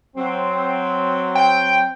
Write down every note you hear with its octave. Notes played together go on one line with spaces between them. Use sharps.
F#3 C4
G5